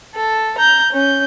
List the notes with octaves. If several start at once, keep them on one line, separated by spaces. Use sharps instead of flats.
A4
A#5 G6
C#4 G6